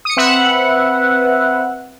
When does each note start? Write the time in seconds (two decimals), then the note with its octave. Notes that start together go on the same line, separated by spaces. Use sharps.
0.05 D#6 C#7
0.17 C4 B4 E5 F#5